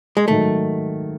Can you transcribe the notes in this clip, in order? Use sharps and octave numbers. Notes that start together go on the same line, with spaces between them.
G#3
G#2 D#3 F#3 A3